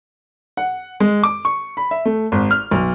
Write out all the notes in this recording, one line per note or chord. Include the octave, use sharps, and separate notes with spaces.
F#5
G#3
D6
C#6
B5
E5
A3
G#1
F6
B1